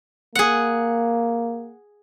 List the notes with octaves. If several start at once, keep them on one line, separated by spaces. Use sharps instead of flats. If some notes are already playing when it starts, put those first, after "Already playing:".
A#3 G#4 F#5